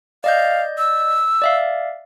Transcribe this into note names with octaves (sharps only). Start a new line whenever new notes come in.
D5 D#5 F5 G6
E6
D5 E5 F5